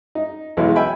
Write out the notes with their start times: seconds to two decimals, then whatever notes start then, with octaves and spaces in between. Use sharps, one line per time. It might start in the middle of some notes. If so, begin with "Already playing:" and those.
0.15 D#4
0.57 B1 E3 G#3
0.76 E5 G5 G#5 B5